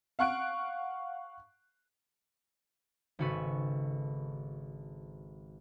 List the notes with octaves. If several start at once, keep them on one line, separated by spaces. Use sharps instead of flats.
F5 F#5 C#6 F#6 D7
G#1 C#3 F#4 A4 B4